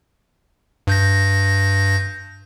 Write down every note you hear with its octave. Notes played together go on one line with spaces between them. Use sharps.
G2 G6 A#6